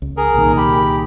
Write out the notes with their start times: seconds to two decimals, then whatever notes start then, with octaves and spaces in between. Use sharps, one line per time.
0.02 C#2
0.17 G#4 A#4
0.34 C2 A#2 D#3
0.57 G4 B5